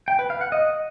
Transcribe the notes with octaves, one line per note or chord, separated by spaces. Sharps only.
G5
B4
F5
F#5
D#5